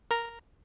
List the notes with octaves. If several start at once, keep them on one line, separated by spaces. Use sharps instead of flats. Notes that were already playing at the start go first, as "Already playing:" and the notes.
A#4 A#5